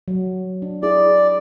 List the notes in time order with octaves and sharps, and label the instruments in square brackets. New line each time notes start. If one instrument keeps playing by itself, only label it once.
[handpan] F#3
D4
[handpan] E4 G#4 [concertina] D5